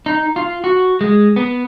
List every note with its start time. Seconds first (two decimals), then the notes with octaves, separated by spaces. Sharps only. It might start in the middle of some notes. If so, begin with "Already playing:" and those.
0.06 D#4
0.36 F4
0.64 F#4
1.01 G#3
1.36 B3